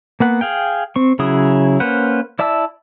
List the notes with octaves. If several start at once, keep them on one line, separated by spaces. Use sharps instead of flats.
A#3 B3 F#5
G#4 F5 G5
C4 C#6
C#3 F#3 E4 G#4 D#6
A#3 C#4 B4 C5 F#5
E4 D5 E5 A5 E6